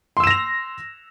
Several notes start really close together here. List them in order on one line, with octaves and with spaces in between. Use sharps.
C6 E6 E7 A#6 F7